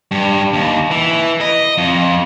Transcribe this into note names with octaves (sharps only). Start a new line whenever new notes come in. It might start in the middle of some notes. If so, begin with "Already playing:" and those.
G2
D#2
E3
D#5
F2